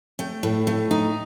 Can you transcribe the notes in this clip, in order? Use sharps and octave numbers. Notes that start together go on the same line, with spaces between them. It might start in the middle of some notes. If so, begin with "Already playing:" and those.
A3 G5
A2
A3
D#4